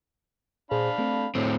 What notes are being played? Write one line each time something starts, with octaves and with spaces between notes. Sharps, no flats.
A#2 D4 G#4 C5 F5 B5
A3 C4 A4
A2 C4 A4 C#5